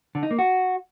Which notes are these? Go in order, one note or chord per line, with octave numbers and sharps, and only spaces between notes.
D3
D#4
A#3
F#4